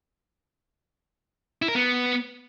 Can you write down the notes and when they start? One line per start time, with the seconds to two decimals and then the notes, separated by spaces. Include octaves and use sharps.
1.62 E4
1.68 A#4
1.75 B3